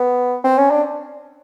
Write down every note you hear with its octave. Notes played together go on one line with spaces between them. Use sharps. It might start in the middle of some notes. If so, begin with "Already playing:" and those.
Already playing: B3
C4
C#4
D4